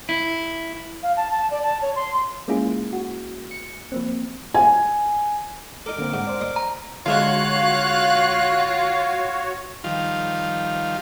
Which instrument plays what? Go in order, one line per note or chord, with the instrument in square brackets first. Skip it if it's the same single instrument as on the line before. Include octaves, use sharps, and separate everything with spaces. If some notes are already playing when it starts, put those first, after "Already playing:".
[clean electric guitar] E4
[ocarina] F5
A5
A5
D5
A5
C#5
C6
[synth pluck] G#3 A#3 C#4 E4 F4 G#4
F#4
C#7
F3 A#3 C4
[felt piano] G#5
[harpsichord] D#4 A4 [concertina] A#4 D6
[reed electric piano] D3 A#3 C4
[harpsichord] G#2 [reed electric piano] F#5
[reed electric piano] C5 D5
[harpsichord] D#5 C6 D#6
[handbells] A#5
[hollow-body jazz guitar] D3 G#3 E5 [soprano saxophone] F4 [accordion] F#4 C#5 [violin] F5 F#6
[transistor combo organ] D#3 F3 G3 F4